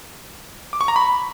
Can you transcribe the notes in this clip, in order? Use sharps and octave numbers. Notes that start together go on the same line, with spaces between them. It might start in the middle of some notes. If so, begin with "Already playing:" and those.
D6
C#6
A#5
B5